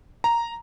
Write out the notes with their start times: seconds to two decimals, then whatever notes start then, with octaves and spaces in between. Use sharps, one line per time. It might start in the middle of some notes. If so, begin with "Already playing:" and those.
0.24 A#5